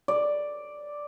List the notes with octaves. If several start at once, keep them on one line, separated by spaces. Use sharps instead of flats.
D5